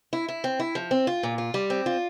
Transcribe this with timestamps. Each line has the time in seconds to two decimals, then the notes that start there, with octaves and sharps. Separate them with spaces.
0.13 E4
0.28 E4
0.44 C4
0.60 E4
0.75 F3
0.91 C4
1.07 F4
1.23 A#2
1.38 F4
1.54 G3
1.70 C4
1.86 F4